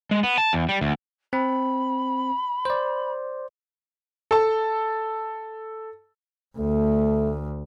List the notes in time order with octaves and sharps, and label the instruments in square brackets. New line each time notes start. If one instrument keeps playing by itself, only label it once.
[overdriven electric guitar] G#3
B3
A5
E2
G3
D2
[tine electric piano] C4 [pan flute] B5
[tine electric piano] C5 D5
[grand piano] A4 A5
[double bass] D2 [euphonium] A3